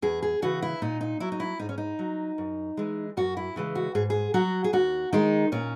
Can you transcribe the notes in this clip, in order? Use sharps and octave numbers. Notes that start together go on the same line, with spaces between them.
E2 G#4
G#4
C#3 E3 F#4
E4
A#2 D#4
D#4
F#3 E4
D#4
E4
G#2 D#4
C#4
D#4
F#3
F#2
E3 G#3
F#2 F#4
E4
C#3 E3 G#3
F#4
G#2 G#4
G#4
F#3 F#4
G#4
D#2 F#4
D#3 G#3 D#4
A#2 C#4